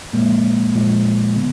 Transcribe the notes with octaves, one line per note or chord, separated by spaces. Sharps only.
A#2 F3 G#3 A#3
A#2 F3 G#3
D3 B3